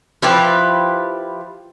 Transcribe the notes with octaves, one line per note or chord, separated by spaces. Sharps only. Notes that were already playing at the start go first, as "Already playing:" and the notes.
F3 E4 G4 B4